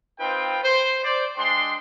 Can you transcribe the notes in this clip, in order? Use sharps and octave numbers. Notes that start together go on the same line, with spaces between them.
C4 D#4 F4 B4 G5
C5
C5 D5
G#3 D4 G5 C6